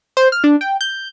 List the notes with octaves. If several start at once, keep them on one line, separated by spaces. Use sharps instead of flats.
C5
F6
D4
G5
G6